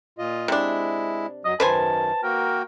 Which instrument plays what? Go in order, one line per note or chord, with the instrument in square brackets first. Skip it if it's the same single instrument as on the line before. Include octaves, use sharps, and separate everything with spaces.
[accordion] A#2 F4 D#5
[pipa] C3 D4 [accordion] G#3 E4
[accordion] F#2 F#3 [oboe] D#5
[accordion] F#2 D#3 [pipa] B4 C5 G#5 [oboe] A5
[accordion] A#3 F#4 G5 [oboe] A#4